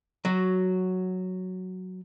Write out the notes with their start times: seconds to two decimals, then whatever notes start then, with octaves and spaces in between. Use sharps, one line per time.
0.25 F#3 F#4